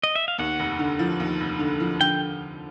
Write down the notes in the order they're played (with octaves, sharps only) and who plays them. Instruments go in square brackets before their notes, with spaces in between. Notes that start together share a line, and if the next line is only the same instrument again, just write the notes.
[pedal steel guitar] D#5
E5
F5
[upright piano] D#2 [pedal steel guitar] F#5
[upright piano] F1
D3
F3
D#2
F1
D3
F3
[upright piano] D3 [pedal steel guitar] G5